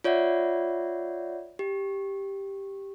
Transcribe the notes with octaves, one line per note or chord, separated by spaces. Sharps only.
F4 C#5 D5 E5 F#5
G4